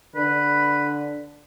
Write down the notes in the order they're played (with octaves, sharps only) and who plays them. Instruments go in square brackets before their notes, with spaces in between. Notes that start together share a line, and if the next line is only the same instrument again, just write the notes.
[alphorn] D3 [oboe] B4